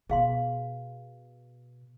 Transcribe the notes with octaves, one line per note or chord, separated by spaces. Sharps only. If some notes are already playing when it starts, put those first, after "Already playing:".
B2 G#4 F5 C6